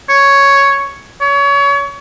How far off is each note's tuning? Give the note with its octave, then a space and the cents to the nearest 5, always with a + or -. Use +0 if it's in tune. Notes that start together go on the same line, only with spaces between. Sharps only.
C#5 +5
C#5 +30